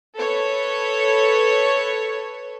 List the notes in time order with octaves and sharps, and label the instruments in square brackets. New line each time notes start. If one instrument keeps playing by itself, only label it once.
[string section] A4 B4 C#5